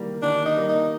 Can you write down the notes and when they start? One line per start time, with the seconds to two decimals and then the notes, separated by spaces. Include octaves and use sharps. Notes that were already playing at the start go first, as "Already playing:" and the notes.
Already playing: D#3 G3 A#3
0.22 D#3 D4
0.45 D#4
0.56 G3 A#3
0.68 D#4